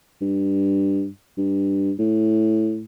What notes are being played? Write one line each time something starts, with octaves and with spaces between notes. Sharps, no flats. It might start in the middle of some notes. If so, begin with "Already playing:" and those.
G2
G2
A2